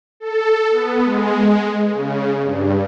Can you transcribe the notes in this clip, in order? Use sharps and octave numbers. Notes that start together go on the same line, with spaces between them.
A4
B3
G#3
C#3
G2